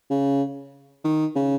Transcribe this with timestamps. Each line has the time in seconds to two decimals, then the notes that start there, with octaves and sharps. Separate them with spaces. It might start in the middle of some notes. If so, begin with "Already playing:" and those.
0.10 C#3
1.04 D#3
1.35 C#3